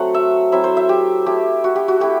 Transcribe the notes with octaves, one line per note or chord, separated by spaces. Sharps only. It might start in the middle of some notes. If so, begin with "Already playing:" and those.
Already playing: F#3 A3 C4 F#5
E5
F#3 C4 E4 E5
C5
E5
G4
A3 E4 G4
F#4
G4
F#4
A3 E4 G4